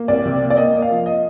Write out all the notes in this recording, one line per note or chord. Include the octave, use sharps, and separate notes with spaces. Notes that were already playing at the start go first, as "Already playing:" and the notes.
Already playing: A#3
C2 D5
C3
A#3
D5
A#3 D#5
A#3
F5
F3
D#5